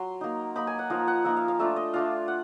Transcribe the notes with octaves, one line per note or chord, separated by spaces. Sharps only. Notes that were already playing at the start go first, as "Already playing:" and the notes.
Already playing: F#3 C6
A#3 D#4
A#3 D#4 B5
G#5
F#5
F3 A#3 D#4 F5
F#5
F3 A#3 D#4 E5
F5
F5
A3 D4 F4 E5
D#5
A3 D4 F4 F5
F#5